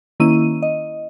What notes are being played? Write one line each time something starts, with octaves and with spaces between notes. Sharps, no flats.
D#3 A#3 C#4 E4 D#7
D#5